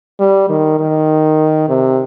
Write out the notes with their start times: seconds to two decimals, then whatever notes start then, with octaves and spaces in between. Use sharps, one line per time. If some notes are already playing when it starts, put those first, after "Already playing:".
0.20 G3
0.49 D#3
0.80 D#3
1.69 C3